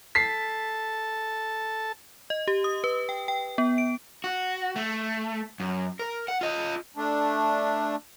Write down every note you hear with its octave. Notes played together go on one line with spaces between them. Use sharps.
A4 A5 B6 C7
D#5
G4
D#6
B4
G5
G5
B3
D7
F#4
A3
F#2
A#4
F#5
F4 D#5
A3 D4